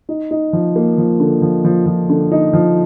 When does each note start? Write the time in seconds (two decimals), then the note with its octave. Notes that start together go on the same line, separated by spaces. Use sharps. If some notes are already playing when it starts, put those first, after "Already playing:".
0.09 D#4
0.31 D#4
0.53 F3
0.76 A#3
0.98 F3
1.20 D3
1.42 F3
1.65 F3
1.86 F3
2.10 D3
2.32 D#4
2.53 F3